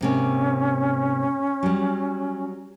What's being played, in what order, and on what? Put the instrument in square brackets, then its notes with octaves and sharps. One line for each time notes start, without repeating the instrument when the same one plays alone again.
[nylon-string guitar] G#2 C3 A#3 [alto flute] C#4
[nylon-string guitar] F#3 G3